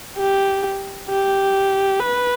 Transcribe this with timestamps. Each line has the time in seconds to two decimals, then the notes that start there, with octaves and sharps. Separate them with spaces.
0.18 G4
1.09 G4
1.99 B4